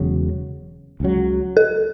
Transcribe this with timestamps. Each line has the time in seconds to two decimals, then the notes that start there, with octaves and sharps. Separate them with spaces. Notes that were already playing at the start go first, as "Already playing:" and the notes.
Already playing: E1 E2 C#3 F#3
1.00 C#2 C#3 F#3
1.57 A4